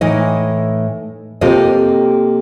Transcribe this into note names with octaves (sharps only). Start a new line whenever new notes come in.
A2 E3 D#4 D#5
C3 A#3 F4 G4 A4 D#5